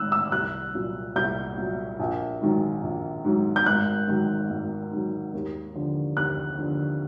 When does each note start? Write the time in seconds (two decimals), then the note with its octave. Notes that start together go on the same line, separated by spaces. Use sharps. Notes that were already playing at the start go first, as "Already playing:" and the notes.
Already playing: A1 G#2 D#3 E6 F#6
0.12 E6
0.32 C2 F#6
0.74 A#2 F#3
1.16 C2 G6
1.58 A#2 F#3
1.99 A#1
2.41 G#2 D#3 F#3
2.83 A#1
3.25 G#2 D#3 F#3
3.56 G6
3.66 G#1 F#6
4.08 G#2 D#3 F#3
4.50 G#1
4.92 G#2 D#3 F#3
5.34 D#2
5.75 D3 F3
6.17 D#2 F#6
6.58 D3 F3